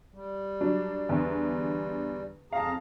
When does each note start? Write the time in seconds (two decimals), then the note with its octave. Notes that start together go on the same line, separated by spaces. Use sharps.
0.14 G3
0.61 F#3 D4
1.09 E2 D3
2.52 F2 G#4 F5 A5 A#5